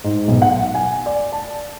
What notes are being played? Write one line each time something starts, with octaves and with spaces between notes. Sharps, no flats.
G#2
B1
F#5
G#5
D5
A5